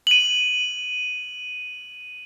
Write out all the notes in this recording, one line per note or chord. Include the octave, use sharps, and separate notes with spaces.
D#7 F#7